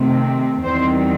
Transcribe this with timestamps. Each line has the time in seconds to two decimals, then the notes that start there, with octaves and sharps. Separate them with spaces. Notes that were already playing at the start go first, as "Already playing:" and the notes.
Already playing: C3 D#3 A3 C4
0.64 E2 D#3 G3 C4 C5